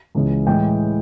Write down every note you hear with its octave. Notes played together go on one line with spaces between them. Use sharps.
C#2 C#3 E3 G#3
A2 E3 G#3 G5